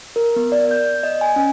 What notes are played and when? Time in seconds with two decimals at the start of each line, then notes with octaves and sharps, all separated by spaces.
0.16 A#4
0.36 B3
0.52 D5
0.71 G6
1.03 D#5
1.21 G#5
1.36 C#4